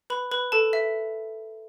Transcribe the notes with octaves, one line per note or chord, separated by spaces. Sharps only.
B4 B5
B4 B5
A4 A5
E5